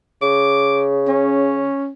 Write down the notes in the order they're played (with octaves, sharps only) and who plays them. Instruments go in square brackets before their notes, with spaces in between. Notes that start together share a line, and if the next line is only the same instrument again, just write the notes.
[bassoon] C#3 [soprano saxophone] D6
[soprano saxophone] C#4